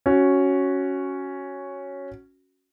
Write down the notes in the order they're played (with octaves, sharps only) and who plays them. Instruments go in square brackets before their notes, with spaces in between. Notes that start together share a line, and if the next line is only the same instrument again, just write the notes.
[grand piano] C#4 F#4